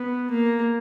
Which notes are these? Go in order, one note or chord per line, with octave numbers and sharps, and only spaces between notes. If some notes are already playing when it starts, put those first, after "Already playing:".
Already playing: B3
A#3